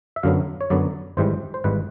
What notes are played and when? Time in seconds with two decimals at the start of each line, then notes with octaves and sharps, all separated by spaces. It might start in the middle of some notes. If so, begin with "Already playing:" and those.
0.16 E5
0.23 F#2 D3 F#3 B3 F5
0.61 C#5
0.70 F#2 D3 F#3 B3 D5
1.17 G#1 G#2 E3 G3 C5
1.54 C5
1.64 G#1 G#2 E3 G3 B4